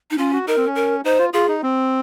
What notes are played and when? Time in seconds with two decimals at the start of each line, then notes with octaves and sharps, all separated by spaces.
0.11 D#4
0.18 C#4 F4
0.33 F#4
0.47 D#4 A#4
0.57 C4
0.66 C#4
0.76 A#4
1.05 D#4 C5
1.19 F4
1.33 F4 G#4
1.48 D#4
1.63 C4